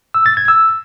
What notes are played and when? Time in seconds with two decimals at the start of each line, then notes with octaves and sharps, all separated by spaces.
0.14 E6
0.26 A6
0.37 G#6
0.48 E6